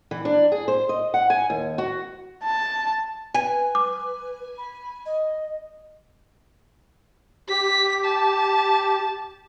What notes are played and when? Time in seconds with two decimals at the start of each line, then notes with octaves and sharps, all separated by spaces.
0.11 E3
0.25 D4
0.52 G#4
0.68 C5
0.89 D#5
1.14 F#5
1.30 G#5
1.50 D#2
1.78 F#4
2.43 A5
3.34 B4 G#5
3.75 D6
4.58 B5
5.06 D#5
7.49 G4 B6
8.05 A5